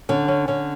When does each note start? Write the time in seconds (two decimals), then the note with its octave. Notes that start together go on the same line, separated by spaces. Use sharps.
0.09 D3 C#4
0.28 C#4
0.48 D3 C#4